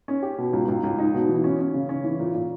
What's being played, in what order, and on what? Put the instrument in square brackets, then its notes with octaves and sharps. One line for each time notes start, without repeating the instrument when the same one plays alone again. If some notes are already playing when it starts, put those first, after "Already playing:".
[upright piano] C#4
G4
B2
C#2
C#2
C#2
D#4
B2
E3
C#4
C#4
C#3
C#4
E3
A#2
A#2